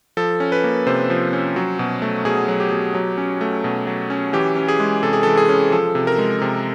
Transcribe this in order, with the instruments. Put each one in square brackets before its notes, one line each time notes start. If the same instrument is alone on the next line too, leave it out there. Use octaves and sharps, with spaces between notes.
[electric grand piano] F3 A4
C#4
B4
A#3
C3 C5
F3
C#4
F#3
B2
A3
B2 G#4
F#3
G4
B2
F#3
C#4
A3
B2
F#3
C#4
E3 G4
C#4
G#4
G#3
C3 A4
G#4
E3 A4
G#4
C#4
F3 A4
C3
A#4
G#3
C3